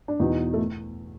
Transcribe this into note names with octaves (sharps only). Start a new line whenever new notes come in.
D4
E2 B2 D#4
A3